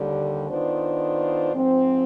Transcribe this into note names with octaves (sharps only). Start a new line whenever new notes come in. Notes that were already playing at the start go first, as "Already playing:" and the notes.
Already playing: D#2 D3 G3
D#3 B3 D4 F4 C5
G#2 F3 C4